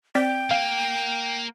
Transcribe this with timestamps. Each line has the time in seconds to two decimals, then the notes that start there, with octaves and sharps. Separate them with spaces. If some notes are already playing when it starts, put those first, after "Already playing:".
0.15 C4 D5 G5 B6
0.51 A#3 F5